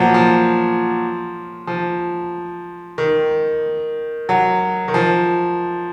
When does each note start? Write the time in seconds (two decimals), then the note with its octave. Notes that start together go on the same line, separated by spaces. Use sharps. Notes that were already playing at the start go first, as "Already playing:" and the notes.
Already playing: A#2 F3 F#3
0.14 F3
1.67 F3
2.98 D#3
4.29 F#3
4.88 D#3
4.94 F3